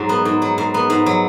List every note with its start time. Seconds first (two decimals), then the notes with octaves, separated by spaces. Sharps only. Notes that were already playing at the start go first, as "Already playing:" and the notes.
Already playing: G#2 F#3
0.09 B3
0.25 G#2
0.42 F#3
0.58 G#2
0.74 B3
0.90 G#2
1.06 F#3